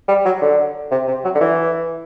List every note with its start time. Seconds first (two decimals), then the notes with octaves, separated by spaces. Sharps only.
0.08 G3
0.25 F#3
0.42 D3
0.91 C3
1.08 C3
1.24 F#3
1.35 D3
1.41 E3